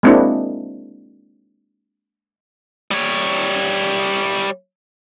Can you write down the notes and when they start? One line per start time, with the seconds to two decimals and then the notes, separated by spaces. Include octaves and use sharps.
0.03 G#3 A#3 C4 D4 E4 F#4
2.91 G3 C#5